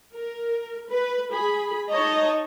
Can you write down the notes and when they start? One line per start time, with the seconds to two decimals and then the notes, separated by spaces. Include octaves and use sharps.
0.15 A#4
0.89 B4
1.32 G#4 B5
1.89 D#4 C#5 D#5 A5 A#5